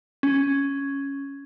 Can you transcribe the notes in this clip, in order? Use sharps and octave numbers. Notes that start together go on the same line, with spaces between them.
C#4